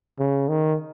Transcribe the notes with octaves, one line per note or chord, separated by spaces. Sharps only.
C#3
D#3